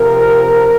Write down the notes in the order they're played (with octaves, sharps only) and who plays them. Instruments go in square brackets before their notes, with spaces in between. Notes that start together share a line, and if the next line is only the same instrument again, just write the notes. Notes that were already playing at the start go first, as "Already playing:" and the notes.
Already playing: [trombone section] C3 F3 A#4